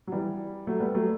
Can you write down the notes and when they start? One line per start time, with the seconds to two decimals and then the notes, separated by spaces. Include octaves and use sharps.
0.07 F#3
0.12 E3 G3
0.67 F#3 A3
0.80 G3 B3
0.95 F#3 A3